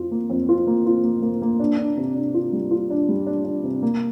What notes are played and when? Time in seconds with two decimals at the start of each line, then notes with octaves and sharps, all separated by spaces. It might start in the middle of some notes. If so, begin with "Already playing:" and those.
Already playing: F2 F4
0.11 A#3
0.30 F2
0.49 F4
0.67 A#3
0.86 F4
1.04 A#3
1.22 A#3
1.42 A#3
1.60 D4
1.78 D4
1.97 C3
2.15 D4
2.34 F4
2.53 G3
2.71 F4
2.90 D4
3.09 G3
3.27 D4
3.45 D4
3.64 C3
3.82 A#3